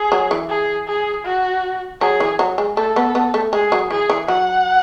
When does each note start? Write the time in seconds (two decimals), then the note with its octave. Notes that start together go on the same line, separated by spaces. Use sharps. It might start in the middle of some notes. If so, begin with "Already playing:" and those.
Already playing: G#4
0.12 F#3
0.31 E3
0.49 G#4
0.88 G#4
1.25 F#4
2.01 F#3 G#4
2.20 E3
2.39 F#3
2.58 G#3
2.77 A3 A4
2.96 B3
3.15 B3
3.34 A3
3.53 G#3 G#4
3.72 F#3
3.91 E3 G#4
4.10 E3
4.28 F#3 F#5